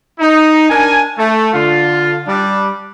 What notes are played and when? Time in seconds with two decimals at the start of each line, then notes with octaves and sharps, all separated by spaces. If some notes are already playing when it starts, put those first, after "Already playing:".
0.20 D#4
0.69 D4 A#4 G#5
1.17 A3
1.53 D3 F4
2.27 G3 D4